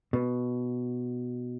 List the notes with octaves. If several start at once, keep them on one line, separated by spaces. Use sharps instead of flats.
B2